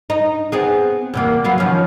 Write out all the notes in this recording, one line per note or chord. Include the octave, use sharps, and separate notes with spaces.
D#4
B3 C4 G#4
E2 C3 A#3
F#3 B3 F5
D#3 F3 C#4